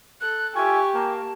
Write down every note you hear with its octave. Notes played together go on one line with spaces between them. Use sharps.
A4 F#6
F4 G4 E5 G5 G#5 C#6
A#3 A5